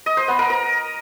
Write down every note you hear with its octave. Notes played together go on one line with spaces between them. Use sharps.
D#5
C5
B3
A#4
A#4